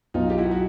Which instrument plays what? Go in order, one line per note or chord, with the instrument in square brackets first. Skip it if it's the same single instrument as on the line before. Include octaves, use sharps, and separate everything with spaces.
[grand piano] B1 B2 F#3 [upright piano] D#4 F4
[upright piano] G4
E4 F#4
F#4